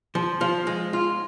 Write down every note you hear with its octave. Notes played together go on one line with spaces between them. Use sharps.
F3
F3
G#3
F4